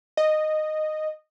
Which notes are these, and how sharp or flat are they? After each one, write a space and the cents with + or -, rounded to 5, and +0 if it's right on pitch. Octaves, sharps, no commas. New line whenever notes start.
D#5 -10